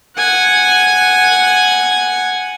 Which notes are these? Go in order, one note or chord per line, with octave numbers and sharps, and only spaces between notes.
F#5 G#5